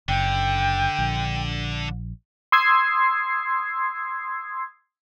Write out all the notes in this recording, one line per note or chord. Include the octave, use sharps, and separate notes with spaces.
F#1 D3 G5
A#1
C6 D#6 E6 G#6 C7